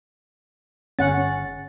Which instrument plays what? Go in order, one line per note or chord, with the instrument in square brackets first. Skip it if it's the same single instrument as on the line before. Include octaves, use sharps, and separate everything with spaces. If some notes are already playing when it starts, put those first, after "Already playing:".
[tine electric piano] G1 A6 [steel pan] C#4 F#5